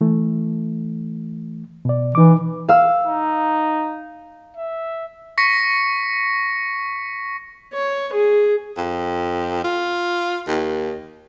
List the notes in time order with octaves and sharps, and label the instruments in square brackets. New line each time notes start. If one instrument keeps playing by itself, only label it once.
[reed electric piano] E3 A3
B2 D5
[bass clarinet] E3 [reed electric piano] D#4 D6
[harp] F5 E6
[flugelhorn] D#4
E5
[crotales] C#6 A#6 B6 C#7
[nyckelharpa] C#5
G#4
[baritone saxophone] F2
F4
D#2